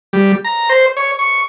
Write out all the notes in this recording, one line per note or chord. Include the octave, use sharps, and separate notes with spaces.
G3
A#5
C5
C#5
C#6